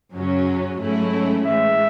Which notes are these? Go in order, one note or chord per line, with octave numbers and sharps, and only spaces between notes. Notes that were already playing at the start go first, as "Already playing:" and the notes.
F#2 C#3 F#3 C#4
G#2 F#3 A3 C#4 E4
A2 E3 G#3 E5